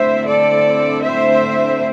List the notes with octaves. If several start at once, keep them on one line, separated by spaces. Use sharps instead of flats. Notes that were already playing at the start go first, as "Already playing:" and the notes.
Already playing: D3 A3 C4 E4 C5 E5
A4 D5
C5 E5